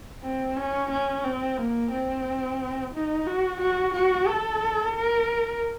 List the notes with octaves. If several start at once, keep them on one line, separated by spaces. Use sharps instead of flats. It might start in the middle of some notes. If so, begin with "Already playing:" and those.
C4
C#4
C#4
C4
A#3
C4
D#4
F#4
F#4
F#4
A4
A#4